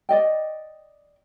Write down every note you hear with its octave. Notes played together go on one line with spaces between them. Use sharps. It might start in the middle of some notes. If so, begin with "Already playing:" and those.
D5 D#5 G5